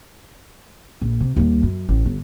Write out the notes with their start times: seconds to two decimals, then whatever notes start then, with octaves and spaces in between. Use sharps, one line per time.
1.02 A#1
1.20 C3
1.36 D#2 G3
1.63 F#2
1.89 A1
2.06 G1